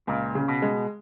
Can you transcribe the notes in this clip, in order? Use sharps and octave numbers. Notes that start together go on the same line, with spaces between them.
C#2 A#2
C#3
B2
G#3